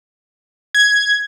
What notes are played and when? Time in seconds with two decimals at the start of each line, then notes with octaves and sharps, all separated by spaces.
0.74 G#6